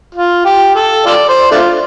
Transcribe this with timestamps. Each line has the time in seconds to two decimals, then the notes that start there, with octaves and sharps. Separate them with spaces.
0.14 F4
0.45 G4
0.75 A4
1.06 F4 A4 D5
1.29 C5
1.52 A3 D4 F4